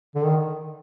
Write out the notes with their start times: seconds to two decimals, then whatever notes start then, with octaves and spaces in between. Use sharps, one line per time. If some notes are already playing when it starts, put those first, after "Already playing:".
0.15 D3
0.25 D#3